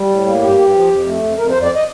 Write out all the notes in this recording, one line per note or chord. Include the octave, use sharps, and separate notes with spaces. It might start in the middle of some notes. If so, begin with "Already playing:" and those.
Already playing: G3
A2
A#3
G2 G4
G2
F3
F2
A3
F2
F2 A#4
C5
F2
D5
D#5